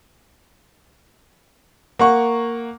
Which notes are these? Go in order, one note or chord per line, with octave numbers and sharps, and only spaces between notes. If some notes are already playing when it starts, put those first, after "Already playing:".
A#3 F#5 C#6